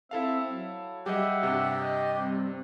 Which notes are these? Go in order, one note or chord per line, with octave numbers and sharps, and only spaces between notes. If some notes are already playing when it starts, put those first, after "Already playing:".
C4 E4 A4 E5 F5
F#3
G3 G4 G#4 D#5 E5 F#5
G2 C3 G4
D#5
G3 C4